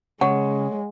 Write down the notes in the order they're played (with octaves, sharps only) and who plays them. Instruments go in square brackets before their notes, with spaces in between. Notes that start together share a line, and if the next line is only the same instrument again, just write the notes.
[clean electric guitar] C#3 [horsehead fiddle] G#3 [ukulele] C#5 [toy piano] F#5